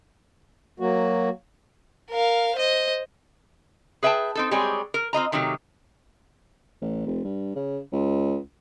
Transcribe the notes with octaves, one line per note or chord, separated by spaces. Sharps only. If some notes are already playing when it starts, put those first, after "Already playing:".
F#3 A#3 F#4
A#4 F5
C5 D#5
G#4 B4 E5 F#5 G5 A5
C4 D#4 A4
G3 G#3 C4 G#4 C#5 D5
A#4
C4 F4 D#5 A#5
C3 D#3 F#3 A3 G4
A1
F1
G2
C#3
C#2